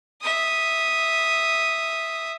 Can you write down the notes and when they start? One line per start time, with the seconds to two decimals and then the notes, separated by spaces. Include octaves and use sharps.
0.22 E5 D#6